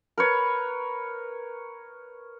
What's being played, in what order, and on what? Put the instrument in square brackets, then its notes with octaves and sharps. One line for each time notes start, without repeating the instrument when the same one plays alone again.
[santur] A#4 B4 C#5